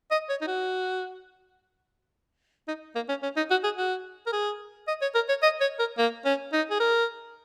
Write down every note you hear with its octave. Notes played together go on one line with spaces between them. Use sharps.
D#5
C#5
D#4
F#4
D#4
A#3
C#4
C#4
D#4
F#4
G#4
F#4
A#4
G#4
D#5
C#5
A#4
C#5
D#5
C#5
A#4
A#3
C#4
D#4
G#4
A#4